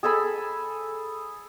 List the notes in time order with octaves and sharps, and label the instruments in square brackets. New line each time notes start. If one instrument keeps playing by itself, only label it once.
[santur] G#4 A4 G#5 B5